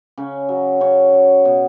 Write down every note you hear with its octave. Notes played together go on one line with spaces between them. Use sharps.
C#3 C#4
F#3
C#3 C#5
F#3
B2